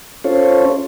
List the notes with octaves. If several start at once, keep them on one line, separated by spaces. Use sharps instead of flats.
C#4 F4 A4 C5 C#5